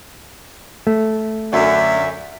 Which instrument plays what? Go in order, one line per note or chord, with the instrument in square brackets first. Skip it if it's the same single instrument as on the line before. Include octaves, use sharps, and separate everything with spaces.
[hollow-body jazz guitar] A3
[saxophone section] F#2 D3 [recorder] E5